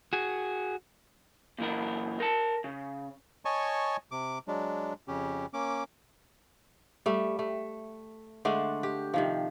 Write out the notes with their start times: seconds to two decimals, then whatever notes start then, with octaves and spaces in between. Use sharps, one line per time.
0.13 F#4 G#4
1.58 A#2 E3 A#4
2.20 A#4 A5
2.64 C#3
3.45 C#5 D#5 G#5 A5 C#6
4.11 C3 D6
4.48 F#3 G#3 D4
5.08 F2 C#3 C#4 G4
5.54 A#3 C#4 D6
7.06 G3 A3
7.39 A3
8.45 D3 G#3 A3 D4
8.83 G4
9.14 C3 D#3 F3